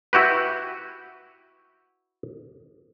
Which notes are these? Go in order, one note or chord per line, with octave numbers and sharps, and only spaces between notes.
E4 F#4 G4 B4